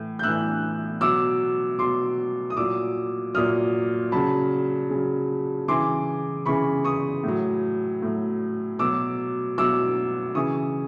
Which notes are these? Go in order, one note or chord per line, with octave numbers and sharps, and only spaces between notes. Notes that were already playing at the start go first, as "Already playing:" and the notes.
Already playing: A2 E3
G6
A2 E3 E6 F#6
B2 F#3 D6 E6
B2 F#3 C6 D6
D#6
A#2 F#3 D6 E6
A#2 F#3 D#6 F6
C#3 F#3 A5 B5
C#3
F#3
C#3 E3 C6 D6
C#3 E3 B5 C#6
C#6 D#6
A2 F#3
A2 F#3
B2 F#3 D6 E6
B2 F#3 D6 E6
C#3 E3 C#6 D#6